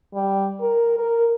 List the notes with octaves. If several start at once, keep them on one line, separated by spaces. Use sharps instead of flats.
G3
A#4
A#4